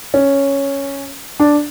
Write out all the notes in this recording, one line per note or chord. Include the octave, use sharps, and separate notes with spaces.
C#4
D4